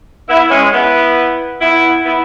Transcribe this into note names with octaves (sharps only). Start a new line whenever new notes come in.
B3 E4
G#3 C#4
B3 E4
B3 E4
B3 E4